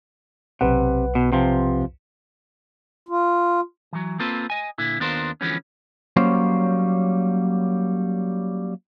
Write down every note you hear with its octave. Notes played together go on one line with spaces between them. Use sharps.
B1 C3 B4 F#5
B2
C3 F3
F4
E3 F#3
A#3 C4 F4 A4 B4 C5
D#5 G#5
A#2 D3 E4
D#2 B3 D4 F4 A#4 C5
D3 E3 F3 G#3 B3 C#4
F#3 G3 A#3 C#4 C5